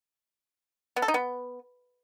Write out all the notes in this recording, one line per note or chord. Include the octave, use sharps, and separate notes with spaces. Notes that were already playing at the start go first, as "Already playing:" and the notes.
B3
A4
D#4
B3